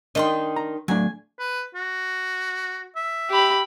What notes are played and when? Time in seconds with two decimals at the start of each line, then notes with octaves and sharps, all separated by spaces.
0.15 D#3 D4 D#5 G5 C6
0.56 A#5
0.88 F#3 A3 D4 G#5
1.39 B4
1.75 F#4
2.96 E5
3.30 G4 B5